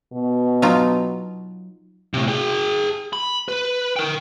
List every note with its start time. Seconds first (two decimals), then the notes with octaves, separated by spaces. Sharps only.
0.13 B2
0.62 F#3 D#4 F4
2.14 A2 C3
2.28 G#4 G5
3.13 B5
3.48 B4
3.96 A#4 G5